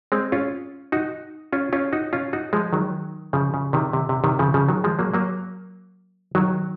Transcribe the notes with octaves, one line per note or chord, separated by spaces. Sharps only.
G#3 C4
C#4 F4
D#4 F#4
C#4 F4
C#4 F4
D#4 F#4
C#4 F4
D#4 F#4
F3 G#3
D#3 F#3
C#3 F3
C#3
C3 D#3
C3
C3
C3 D#3
C#3 F3
C#3 F3
D#3 F#3
F3 G#3
F#3 A#3
F#3 A#3
D#3 F#3